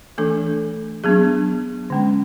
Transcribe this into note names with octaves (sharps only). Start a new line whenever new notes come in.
E3 A3 D4 A4
F#3 B3 D4 G#4
D3 G#3 C#4